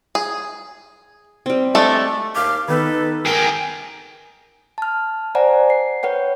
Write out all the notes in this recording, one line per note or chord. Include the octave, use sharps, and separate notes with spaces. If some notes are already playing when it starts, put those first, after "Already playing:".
G#4
G3 C4
G#3 A3 D4 A4
D#2 F5 D6 F6
D#3 B3 D#4 A4 B4
G#4 A#4 G5
A5 F6
C5 D5 F#5 G#5 A#5
C7
B4 C#5 F#5 G5